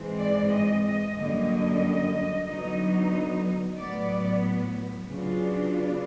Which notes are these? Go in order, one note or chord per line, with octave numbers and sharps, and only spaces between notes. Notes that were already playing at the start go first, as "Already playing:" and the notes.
Already playing: G#2 E3 G#3 C4
D5
D#5
D#5
F#2 D3 G3 A#3 D#5
D3 F#3 B3 D#4
A2 F#3 B3 D5
C#3 F#3 B3 D4 F4
D5